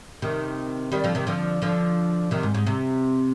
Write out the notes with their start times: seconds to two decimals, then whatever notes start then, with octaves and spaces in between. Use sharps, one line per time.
0.22 C3 D#3
0.92 D#3 G3
1.04 D3 F3
1.15 C3 D#3
1.27 D3 F3
1.62 D3 F3
2.31 C3 D#3
2.43 G#2
2.54 G#2
2.67 C3